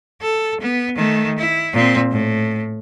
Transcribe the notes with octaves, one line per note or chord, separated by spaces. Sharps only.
A4
B3
D#3 A3
E4
A#2 C4
A2